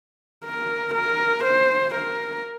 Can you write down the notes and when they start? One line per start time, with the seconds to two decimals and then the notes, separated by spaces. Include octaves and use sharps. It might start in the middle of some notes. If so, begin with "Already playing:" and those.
0.45 A#4
0.95 A#4
1.45 C5
1.95 A#4